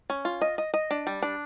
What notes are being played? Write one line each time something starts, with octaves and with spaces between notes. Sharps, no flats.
C#4
F4
D#5
D#5
D#5
D4
G3
D4